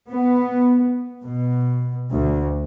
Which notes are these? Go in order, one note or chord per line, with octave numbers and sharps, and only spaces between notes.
B3
B2
D2